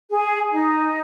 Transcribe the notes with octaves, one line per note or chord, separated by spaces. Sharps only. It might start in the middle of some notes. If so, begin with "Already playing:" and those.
G#4
D#4